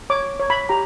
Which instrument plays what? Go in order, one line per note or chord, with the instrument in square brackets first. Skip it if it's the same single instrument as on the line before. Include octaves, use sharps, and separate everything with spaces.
[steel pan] C#5 D6
C#5
B5
G4 A#5